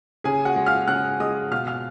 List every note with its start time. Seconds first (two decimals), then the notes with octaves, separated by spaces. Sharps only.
0.24 C#3 G#4 G#5
0.45 F#4 F#5
0.56 G#3
0.66 F5 F6
0.88 C#3 F#5 F#6
1.20 G#3 D#5 D#6
1.51 B2 F5 F6
1.67 F5 F6